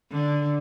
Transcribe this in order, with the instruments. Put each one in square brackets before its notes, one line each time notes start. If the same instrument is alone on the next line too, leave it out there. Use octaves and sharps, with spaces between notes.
[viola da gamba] D3